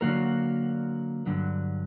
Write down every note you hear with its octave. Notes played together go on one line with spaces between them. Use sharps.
D3 F#3 A#3 F#4 A#4
G2 D3 F#3